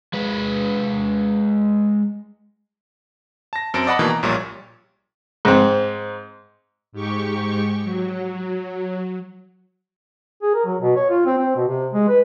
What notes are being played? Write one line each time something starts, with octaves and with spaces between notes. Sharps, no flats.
G#3 B4
A5 A#6
F#2 C4 A5 A#6 D7
D5 D#5 F#5 A5 B5
B2 D#3 E3 A#3
A#5
A#1 A#2 G3 C#5
G#2 C4
G#2 G4 C#6
F#3
G#4
A#4
F#3
B2
C#5
F4
C4
C4
B2
C3
G#3
B4